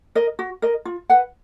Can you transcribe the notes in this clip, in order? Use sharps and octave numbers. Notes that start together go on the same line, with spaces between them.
A#4 D#5
F#4
A#4 D#5
F4
B4 F#5